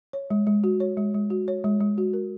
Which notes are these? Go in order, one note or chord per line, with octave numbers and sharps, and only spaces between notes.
C#5
G#3
G#3
F#4
C#5
G#3
G#3
F#4
C#5
G#3
G#3
F#4
A#4